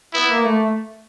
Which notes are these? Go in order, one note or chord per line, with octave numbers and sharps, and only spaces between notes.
B3 E4
A#3
A3